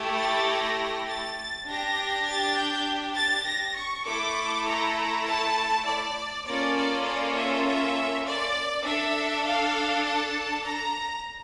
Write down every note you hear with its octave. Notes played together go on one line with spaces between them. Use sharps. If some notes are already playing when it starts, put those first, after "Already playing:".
Already playing: A3 E4 G4
A6
A#6
A6
D4 G4 A#6
A6
G6
A6
A#6
C#6
A3 E4 A4 D6
A#5
A5
D5
A#3 C#4 F4 A4 D5
D5
D5
E5
E5
D5
D4 A4 E5
F5
A5
A#5